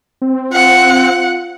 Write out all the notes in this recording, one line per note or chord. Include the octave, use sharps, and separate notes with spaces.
C4
F4 F#5